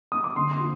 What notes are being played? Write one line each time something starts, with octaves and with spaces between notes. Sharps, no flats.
D#6
D6
D3 C6
C6
F3